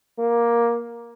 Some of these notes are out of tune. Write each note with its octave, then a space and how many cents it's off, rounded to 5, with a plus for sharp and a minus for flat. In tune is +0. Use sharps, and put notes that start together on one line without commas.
A#3 +10